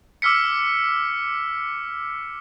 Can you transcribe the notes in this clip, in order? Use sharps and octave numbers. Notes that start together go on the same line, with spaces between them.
D6 E6 F6 B6 C#7